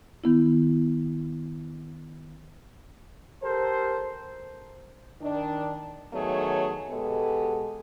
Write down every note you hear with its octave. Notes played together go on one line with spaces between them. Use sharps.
D#3 B3 E4
G4 A4 A#4 C5
D#3 D4
D#3 F#3 A3 B3 G#4 C#5
B2 G#3 B3 G4 A4